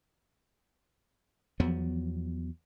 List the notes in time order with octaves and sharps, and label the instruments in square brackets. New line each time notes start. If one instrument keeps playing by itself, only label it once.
[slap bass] E2 F3 F#3 B3